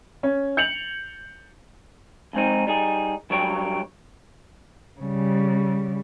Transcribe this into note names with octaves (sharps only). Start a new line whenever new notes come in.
C#4
G6 C#7 F7 F#7
F2 G#2 C4 D#4
G3 D#4 G#4
G2 F#3 G3 G4 C#5
C#3 G3